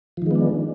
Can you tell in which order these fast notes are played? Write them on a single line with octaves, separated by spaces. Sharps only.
F3 D#3 G#3 B3 D4